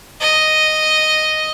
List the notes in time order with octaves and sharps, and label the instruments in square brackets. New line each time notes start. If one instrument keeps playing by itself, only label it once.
[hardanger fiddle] D#5